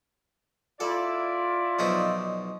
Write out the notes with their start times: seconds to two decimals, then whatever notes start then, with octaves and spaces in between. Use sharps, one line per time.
0.80 E4 F4 A4 D5
1.79 B1 F3 D#4